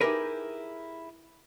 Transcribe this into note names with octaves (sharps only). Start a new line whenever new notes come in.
D#4 E4 G4 G#4 A#4 B4